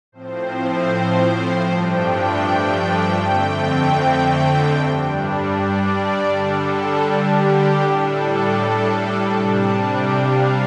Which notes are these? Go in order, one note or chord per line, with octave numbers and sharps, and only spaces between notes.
A2 F3 C4 C5
G2 F3 A3 D4 G5
F2 D3 A3 C4 G5
G2 G3 D4
D5
D3 G3 D4 A4
G4
A2 G3 D4 A4
C3 G3 D4 A5
G5
F5